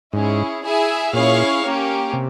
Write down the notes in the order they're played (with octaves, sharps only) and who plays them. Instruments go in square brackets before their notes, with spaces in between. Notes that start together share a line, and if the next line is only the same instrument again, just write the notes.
[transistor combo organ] G#2 [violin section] C#4 E4 G#4
[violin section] E4 G#4 E5 G#5
[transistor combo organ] A#2 [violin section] C#4 E4 G#4 C#5 F5
[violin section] A#3 C#4 G4
[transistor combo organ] C3